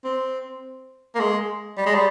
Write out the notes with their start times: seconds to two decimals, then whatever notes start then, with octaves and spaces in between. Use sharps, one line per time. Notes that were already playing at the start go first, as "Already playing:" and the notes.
0.04 C4
1.15 A#3
1.20 G#3
1.77 G3
1.86 G#3
1.94 G3